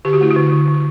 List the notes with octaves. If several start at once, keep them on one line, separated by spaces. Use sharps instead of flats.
D3 G4
F#4
A3 E4
F#4
D3
D3
D3